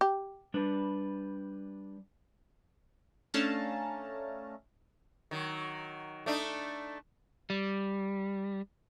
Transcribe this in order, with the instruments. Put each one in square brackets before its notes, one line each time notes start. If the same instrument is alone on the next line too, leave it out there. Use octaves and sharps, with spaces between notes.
[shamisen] G4
[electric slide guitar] G3 D4 B4
[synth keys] A3 C#4 D4 F5 A5 A#5
[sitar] D#3 F#3
A3 D4 D#4
[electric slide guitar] G3